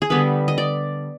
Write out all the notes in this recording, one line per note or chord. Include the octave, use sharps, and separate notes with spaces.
G#4
D3 G3 B3 B4
D#5
D5